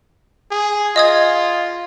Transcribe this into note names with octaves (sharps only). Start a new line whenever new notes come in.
G#4
F4 D#5 D#6 G#6